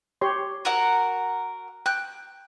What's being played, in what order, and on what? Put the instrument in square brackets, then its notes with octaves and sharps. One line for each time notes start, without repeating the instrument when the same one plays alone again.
[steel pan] G4 C#5 C6
[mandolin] F#4 A#4 F#5
[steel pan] G5 [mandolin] F#6